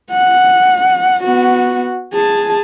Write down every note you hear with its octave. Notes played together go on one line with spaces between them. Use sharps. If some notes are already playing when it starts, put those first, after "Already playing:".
F#5
B3 F#4
G#4 A5